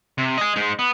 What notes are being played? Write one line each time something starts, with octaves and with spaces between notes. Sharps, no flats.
C3
D#5 G#5
G#3 D#4
B3